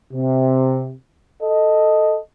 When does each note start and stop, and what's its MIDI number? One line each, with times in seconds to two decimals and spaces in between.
0.13 0.92 48
1.42 2.18 69
1.42 2.18 75